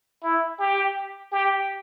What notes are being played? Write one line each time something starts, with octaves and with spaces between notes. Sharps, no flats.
E4
G4
G4